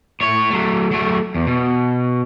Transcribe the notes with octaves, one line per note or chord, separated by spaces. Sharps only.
A2 C#5
F#3 A3
F#3 A3
E2
B2